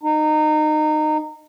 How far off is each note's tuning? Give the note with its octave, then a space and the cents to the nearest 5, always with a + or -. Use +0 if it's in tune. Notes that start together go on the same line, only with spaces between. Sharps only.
D#4 -25